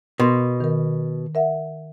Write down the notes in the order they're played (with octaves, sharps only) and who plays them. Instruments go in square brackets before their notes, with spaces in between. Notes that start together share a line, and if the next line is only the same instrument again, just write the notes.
[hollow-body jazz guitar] B2 [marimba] A#4 C6
[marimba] D#3 A#4
A#4 E5 F#5